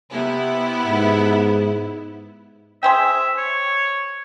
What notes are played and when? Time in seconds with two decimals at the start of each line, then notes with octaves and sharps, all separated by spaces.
0.11 C3 B3 E4
0.87 G#2
2.83 G#4 C5 E5 G5
3.38 C#5